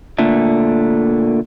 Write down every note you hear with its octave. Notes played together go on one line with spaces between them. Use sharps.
A#2 D3 A3